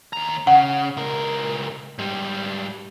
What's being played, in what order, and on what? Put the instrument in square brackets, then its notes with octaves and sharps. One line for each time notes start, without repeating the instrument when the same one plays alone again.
[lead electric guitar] D#2 A#5
[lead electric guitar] C#3 [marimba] F#5
[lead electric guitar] C#2 A#4
G#2 G3